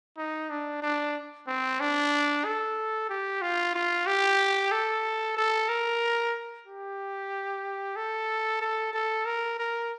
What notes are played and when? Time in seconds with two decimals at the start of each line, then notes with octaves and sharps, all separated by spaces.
0.18 D#4
0.50 D4
0.82 D4
1.47 C4
1.80 D4
2.44 A4
3.09 G4
3.42 F4
3.75 F4
4.06 G4
4.72 A4
5.37 A4
5.69 A#4
6.66 G4
7.96 A4
8.61 A4
8.93 A4
9.25 A#4
9.59 A#4